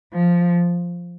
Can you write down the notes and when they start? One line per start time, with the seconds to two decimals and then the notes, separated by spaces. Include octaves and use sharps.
0.14 F3